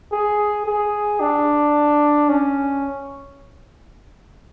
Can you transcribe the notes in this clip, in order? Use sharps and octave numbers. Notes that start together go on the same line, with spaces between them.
G#4
G#4
D4
C#4